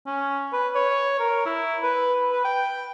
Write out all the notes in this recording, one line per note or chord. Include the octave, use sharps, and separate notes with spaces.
C#4
B4
C#5
A#4
E4
B4
B4
G5